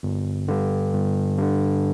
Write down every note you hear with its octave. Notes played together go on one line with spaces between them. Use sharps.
G1
G2 D3
G1
G2 D3